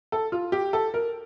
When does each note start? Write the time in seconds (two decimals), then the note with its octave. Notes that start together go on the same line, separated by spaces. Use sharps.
0.12 A4
0.32 F4
0.52 G4
0.73 A4
0.94 A#4